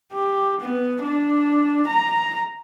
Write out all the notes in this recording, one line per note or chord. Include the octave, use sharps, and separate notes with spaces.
G4
B3
D4
A#5